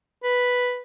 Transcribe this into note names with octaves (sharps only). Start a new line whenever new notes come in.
B4